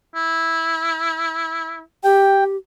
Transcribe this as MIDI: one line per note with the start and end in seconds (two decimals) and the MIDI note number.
0.15 1.81 64
2.04 2.56 67
2.04 2.44 79